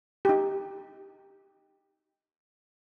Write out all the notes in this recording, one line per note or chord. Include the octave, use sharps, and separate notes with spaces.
D#4 G4